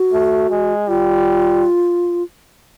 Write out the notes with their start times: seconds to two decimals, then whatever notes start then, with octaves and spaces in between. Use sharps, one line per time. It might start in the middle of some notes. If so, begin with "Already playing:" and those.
Already playing: F#4
0.13 A3
0.50 G#3
0.88 G3 F4